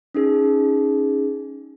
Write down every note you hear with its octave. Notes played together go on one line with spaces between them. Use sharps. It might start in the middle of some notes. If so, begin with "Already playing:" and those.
C#4 D#4 G#4